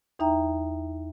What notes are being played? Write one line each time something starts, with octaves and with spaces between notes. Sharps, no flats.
E2 D#4 E5 G5 A#5